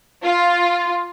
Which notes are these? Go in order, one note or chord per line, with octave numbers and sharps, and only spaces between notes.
F4